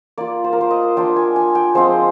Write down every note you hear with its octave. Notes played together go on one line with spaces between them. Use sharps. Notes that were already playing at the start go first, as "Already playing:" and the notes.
A#3 F4 D5
C5
A#4
C5
D#5
A#3 D4 F4 G5
G#5
G#5
G5
F3 G#3 C4 F4 C5